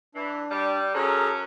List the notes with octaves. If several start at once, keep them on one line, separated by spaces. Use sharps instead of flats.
E3 D4
G3
F#2 C#4 G#4 A4 A#5